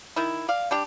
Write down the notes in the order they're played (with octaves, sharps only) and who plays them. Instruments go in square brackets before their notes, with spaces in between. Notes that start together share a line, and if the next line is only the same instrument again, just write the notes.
[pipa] D#3 E4
D5 F5
G3 D4 G4